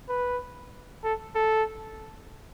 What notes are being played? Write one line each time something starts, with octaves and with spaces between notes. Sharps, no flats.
B4
A4
A4